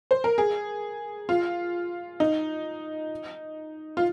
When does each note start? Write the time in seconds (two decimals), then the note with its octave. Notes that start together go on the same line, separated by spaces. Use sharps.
0.11 C5
0.24 A#4
0.38 G#4
1.29 F4
2.20 D#4
3.97 F4